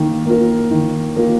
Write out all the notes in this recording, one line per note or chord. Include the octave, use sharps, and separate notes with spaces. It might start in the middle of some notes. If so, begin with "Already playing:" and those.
Already playing: D#3 A#3
A#3 F4 A#4
D#3
A#3 F4 A#4